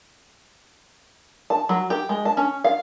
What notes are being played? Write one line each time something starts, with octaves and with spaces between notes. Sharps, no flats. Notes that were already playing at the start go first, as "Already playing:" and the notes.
A5
F#3
G4
G#3
A5
C#4
F5